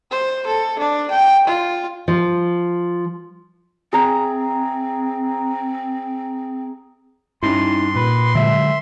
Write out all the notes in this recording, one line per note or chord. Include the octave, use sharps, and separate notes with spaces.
C5
A4
D4
G5
F4
F3
C4 G#4 E5 A#5
G2 C#4 D#4 E4 C6
A#2 B4
D3 F#3 G#3 E5